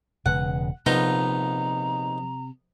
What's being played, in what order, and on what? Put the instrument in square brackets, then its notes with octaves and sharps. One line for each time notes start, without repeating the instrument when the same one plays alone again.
[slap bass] E1 C#3 G#3 [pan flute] B4 [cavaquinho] F#5
[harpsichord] A#1 B3 F4 [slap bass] C3 [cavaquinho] D#4 [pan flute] A#5